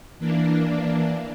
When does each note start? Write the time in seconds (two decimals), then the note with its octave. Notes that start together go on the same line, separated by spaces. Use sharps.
0.19 E3 A#3 D4